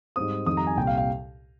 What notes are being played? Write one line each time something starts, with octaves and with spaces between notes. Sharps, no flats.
G#2 G3 C4 D#6
F2 D#3 G3 D#6
A#5
G#5
C2 A#2 G3 G5
F5
F5